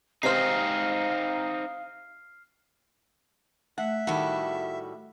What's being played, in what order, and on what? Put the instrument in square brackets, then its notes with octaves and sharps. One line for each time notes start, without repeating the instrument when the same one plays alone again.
[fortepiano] C3 C5 [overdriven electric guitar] C4 D#4 [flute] F5 [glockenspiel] F6 C7
[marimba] A3 [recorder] E5 [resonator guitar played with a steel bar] F#5
[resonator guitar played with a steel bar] A2 D#3 G3 [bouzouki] F#4 A4